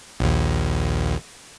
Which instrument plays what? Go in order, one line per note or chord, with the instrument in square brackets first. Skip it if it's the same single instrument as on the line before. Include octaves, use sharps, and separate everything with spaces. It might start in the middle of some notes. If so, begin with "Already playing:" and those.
[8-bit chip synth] A#1 D#2